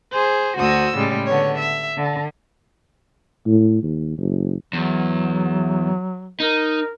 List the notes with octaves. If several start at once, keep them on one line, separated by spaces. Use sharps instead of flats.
G#4 C5
D2 F#4 C5 D#6 E6
A2 C#3 G3 G#3
D3 B3 C#5
E5
D3
A2
D#2
F#1
E2 F#3
D#4 A#4